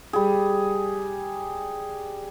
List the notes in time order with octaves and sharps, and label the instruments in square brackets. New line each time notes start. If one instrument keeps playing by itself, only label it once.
[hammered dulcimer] G3 G#4